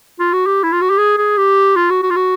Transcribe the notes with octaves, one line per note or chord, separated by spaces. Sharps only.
F4
F#4
G4
E4
F4
F#4
G4
G#4
G#4
G4
F4
F#4
F#4
F4
F#4